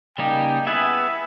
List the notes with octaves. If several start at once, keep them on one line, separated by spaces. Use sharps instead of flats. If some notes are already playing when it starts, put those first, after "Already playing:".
C#3 G3 A#3 D#4 G4 G5
B3 E4 G#4 B4 E5